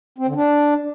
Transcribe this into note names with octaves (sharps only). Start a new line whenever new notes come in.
C4
D3
D4